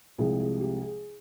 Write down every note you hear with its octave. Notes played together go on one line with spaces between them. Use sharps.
C2 C3 F3 G#3 G#4
G#4
G4
G#4